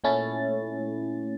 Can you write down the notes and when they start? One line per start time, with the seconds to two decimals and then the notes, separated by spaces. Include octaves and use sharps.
0.04 A#2 A3 C#4 E4 A6